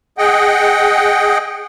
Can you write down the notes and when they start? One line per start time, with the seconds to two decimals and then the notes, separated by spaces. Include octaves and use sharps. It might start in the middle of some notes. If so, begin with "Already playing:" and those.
0.18 G#4 D#5 F#5 G5